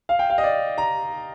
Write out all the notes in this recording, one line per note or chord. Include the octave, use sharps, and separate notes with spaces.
F5
G5
F5
D#5
D5
A#5